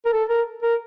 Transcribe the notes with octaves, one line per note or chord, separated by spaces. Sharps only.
A#4
A4
A#4
A#4